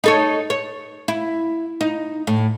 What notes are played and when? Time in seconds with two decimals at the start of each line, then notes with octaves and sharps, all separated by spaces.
0.04 D#4 A4 C#5
0.50 C#5
1.08 E4
1.81 D#4
2.27 A2